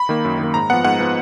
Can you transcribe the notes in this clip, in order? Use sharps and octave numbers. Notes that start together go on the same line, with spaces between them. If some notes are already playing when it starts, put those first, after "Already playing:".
Already playing: B5
D#3 A#3
F#2
D#3 A#3
G#2 A#5
F3 B3 F#5
G#2 F#5
F3 B3